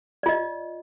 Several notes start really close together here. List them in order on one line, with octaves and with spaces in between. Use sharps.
D5 F4 D#5